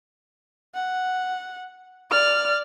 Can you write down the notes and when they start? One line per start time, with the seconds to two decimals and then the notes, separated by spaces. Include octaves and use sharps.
0.75 F#5
2.11 D5 F6